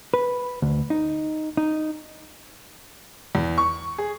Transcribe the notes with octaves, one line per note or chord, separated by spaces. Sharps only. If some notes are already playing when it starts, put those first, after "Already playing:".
B4
D2
D#4
D#4
E2
C#6
G#4